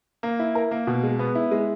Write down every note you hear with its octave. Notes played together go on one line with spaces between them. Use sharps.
A#3
E4
A#4
A#3
B2
G#3
B3
E4
G#3